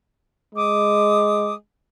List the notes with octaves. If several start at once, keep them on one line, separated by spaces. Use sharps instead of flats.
G#3 D6 D#6